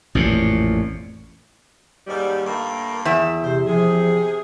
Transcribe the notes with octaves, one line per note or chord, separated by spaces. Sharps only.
A1 F2 A#2
D#2 G#2 G3
G2 A3 A#3
E2 E5
C3 C5
C3 F3 G#4